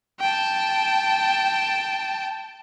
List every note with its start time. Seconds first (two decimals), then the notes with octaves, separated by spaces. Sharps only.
0.20 G5 A5